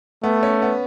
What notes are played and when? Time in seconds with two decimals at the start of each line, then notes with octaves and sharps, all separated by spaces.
0.23 A3 B3
0.43 C#4
0.62 B3